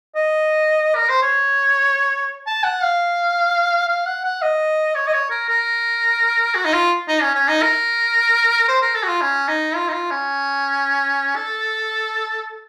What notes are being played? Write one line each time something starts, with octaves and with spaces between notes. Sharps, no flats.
D#5
A#4
C5
C#5
A5
F#5
F5
F5
F#5
F#5
D#5
C#5
D#5
C#5
A#4
A#4
F#4
D#4
F4
D#4
C#4
C#4
D#4
A#4
C5
A#4
A4
F#4
F4
C#4
D#4
F4
D#4
F4
C#4
A4